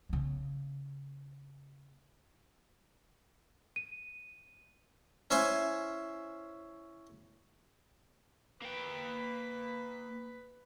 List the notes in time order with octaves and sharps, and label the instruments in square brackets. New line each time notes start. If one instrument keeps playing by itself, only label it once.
[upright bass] C#3 A#3
[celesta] D#7
[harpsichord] C#4 E4 C5 G#5
[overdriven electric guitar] A#3 G5 [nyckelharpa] B4 B5